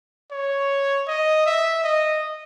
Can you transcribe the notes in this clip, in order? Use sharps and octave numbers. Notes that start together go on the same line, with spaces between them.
C#5
D#5
E5
D#5